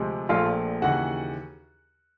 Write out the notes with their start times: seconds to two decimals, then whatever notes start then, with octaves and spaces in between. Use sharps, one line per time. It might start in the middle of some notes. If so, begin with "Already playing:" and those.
Already playing: D2 C3 F3 G#3
0.29 A#1 A#2 F3 A3 F4 F5
0.82 D#2 C#3 E3 F#4 F#5